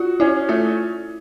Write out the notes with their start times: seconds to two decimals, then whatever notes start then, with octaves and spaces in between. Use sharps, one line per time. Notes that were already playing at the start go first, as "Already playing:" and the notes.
Already playing: F4 F#4
0.20 C#4 E4
0.49 A3 F4